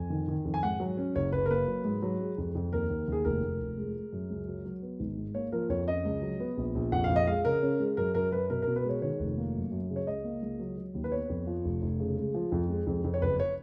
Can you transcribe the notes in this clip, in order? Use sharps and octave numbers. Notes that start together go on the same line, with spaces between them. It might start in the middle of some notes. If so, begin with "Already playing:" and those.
Already playing: F2 G#5
D#3
D#3
F2
G#5
G#2 F#5
F#3
C#4
F#1 C#5
F#1 B4
A#4
A#3 B4
F#3
G#2
F#3
G#3
F2
F2
D#2 A#4
D#2
D#2 G#4
F1 A#4
F1
F1
G#3
G#3
F#2
C#2
F#3
F#3
B3
G#1
G#2
A#3 C#5
F3 A#4
F2 C#5
C#4 D#5
C#2
F#3
B3
A#1
A#1
F2 F#5
F5
F2
D#5
G#3 F5
C#3 A#4
C#4
G#3
F#2 A#4
F#2 A#4
F#2 B4
B2 A#4
A#4
B2
B4
G#3 C#5
D#3 C#5
F1
A#3
F#2
F#2
C#3
C#5
C#2 D#5
A#3
C#2
F#3
F#3
D#2
B4
B3 C#5
F2
F3
F1
F1
C#3
G#3
F3
F2
G#3
F2
F2
C#5
F#1 B4
C#5